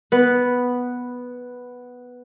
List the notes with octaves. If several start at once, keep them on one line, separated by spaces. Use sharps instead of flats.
B3 B4